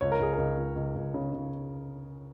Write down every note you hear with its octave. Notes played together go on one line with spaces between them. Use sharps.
C#2 C#5
A#4
C#2 G#4
C#2 A#4
C#2
C#2
C#2
C#3
C#3